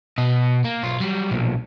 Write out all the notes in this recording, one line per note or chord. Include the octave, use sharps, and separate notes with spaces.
B2 D#5
A#3
B1 F4
F#3 G3
B1 A#2